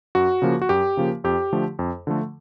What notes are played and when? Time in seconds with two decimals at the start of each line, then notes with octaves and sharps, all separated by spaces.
0.15 F#2 F#4
0.42 C#3 F3 A#3
0.62 F#4
0.69 F#2 G4
0.97 C#3 F3 A#3
1.24 F2 G4
1.52 D3 F3 A3
1.79 F2
2.07 D3 F3 A3